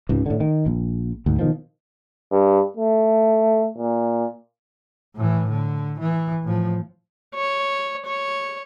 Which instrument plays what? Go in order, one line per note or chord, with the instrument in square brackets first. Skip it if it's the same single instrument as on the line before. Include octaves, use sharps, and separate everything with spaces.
[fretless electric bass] C#2 G#2 C3
A2 D3
D#3
A#1
D2 G#2
B2 D#3 F3
[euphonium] G2
A3
A#2
[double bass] A2 E3
D3
E3
A2 F3
[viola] C#5
C#5